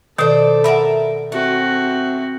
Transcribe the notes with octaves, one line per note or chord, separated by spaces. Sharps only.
B2 D#3 A4 C5 D5
A#4 E5 F#5 B5
A3 C4 F#4